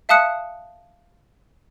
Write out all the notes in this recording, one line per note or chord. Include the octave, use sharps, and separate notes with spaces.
E5 F5 A5 D#6 F#6 C#7